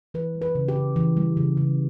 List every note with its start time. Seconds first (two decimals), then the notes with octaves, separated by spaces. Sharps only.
0.14 E3 B4
0.35 G3
0.42 B4
0.55 C#3
0.68 G4
0.76 C#3
0.96 E3
1.17 G3
1.37 C#3
1.57 C#3